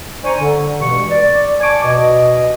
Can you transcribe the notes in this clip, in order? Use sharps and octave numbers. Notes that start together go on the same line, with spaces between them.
D4 C5 G#5 A#5 C#6
D3
G2 B2 E3 G#3 C#6
D5
D5 G#5 A5 C#6 D6
B2 D#5